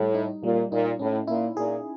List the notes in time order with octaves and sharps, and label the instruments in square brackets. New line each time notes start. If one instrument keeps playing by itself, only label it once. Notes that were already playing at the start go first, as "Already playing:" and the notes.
Already playing: [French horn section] A2 [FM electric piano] G3
[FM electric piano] D#4
[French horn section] A#2 [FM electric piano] G3
[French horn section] A#2 [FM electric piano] D#4
[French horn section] A2 [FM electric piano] C#4
[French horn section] A#2 [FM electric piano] E4
[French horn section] A#2 [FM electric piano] G#4